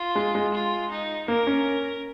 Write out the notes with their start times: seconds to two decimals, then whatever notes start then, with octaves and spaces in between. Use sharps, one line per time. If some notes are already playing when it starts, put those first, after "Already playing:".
Already playing: F4
0.15 G#3
0.35 G#3
0.54 F4
0.91 D#4
1.28 A#3 A#4
1.47 C#4